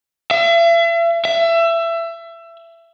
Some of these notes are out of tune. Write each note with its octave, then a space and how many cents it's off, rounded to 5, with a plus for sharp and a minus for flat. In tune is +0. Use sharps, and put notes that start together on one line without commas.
E5 +40
E5 +25